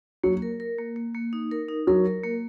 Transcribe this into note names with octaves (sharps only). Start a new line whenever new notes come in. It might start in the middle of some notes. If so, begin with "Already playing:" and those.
F#3 A#3
A#4
A#4
A#3
A#3
A#3
D#4
A#4
D#4
F#3 A#4
A#4
A#3